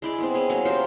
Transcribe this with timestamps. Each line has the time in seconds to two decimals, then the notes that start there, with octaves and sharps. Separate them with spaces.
0.02 G#3 E4 D5
0.18 G#3 B3 C4
0.34 G#3 C#4 G#4
0.50 F#3 A#3 C#5
0.65 F4 G4 A#4 C5